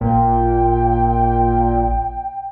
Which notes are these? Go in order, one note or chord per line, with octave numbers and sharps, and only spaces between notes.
A1 A#2 G5